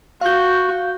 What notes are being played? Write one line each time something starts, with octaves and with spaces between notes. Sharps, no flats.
F#4 F5 G6